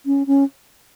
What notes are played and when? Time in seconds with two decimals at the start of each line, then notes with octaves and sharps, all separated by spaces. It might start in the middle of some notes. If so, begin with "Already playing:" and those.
0.06 C#4
0.27 C#4